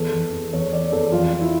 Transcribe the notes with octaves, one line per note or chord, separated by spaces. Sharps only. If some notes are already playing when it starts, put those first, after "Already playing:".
Already playing: E2 A4
E2
E2
E2 C#5
E2 D5
E2 A4
F2 F4
F3
E4